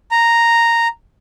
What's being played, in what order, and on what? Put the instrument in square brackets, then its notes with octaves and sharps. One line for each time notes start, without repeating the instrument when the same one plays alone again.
[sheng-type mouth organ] A#5